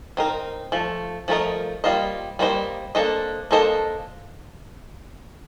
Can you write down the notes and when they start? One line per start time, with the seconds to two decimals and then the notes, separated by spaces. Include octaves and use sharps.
0.17 C4 D#4 A#4
0.72 F3 A3
1.28 F3 A3 D#4 A#4 D#5
1.84 G3 A#3 F4 C5 D#5
2.39 G3 A#3 F4 C5 D#5
2.95 A#3 D4 A4 C5 D#5
3.51 A#3 D4 A4 C5 D#5